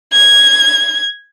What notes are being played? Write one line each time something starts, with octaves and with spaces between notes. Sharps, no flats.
G#6